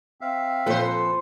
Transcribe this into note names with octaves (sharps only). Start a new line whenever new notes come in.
C4 E5 F5
F2 A#2 A4 B4 C5